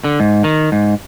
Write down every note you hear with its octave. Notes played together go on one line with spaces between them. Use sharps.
D3
G#2
D#3
G#2